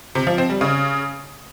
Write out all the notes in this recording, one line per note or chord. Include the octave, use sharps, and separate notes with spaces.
C3
F3
C4
G3
C#3